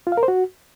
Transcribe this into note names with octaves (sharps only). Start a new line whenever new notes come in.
F4
F5
A#4
C5
F#4